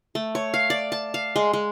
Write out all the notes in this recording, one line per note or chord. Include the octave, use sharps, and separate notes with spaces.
A3
C#5
F5
D5
A5
F5
G#3
G#3